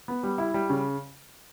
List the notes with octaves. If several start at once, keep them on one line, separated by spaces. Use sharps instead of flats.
B3
G3
E4
G3
C#3